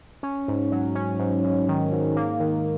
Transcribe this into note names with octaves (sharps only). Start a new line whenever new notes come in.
C#4
G#2
F#3
C#4
G#2
G#2
D#3
G#2
A#3
D#3